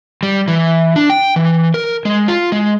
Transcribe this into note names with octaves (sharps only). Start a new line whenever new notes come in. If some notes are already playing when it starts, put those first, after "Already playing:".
G3
E3
D4
G5
E3
A#4
G#3
F4
G#3